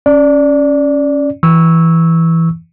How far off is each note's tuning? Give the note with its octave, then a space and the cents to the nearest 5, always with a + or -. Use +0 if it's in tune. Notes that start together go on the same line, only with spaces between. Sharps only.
C#4 +0 D5 -5
E3 +0 C#6 -5 E6 -15